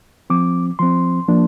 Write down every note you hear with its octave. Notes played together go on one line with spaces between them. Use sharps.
F3 C4 D6
F3 C4 C6
F3 A#3 D4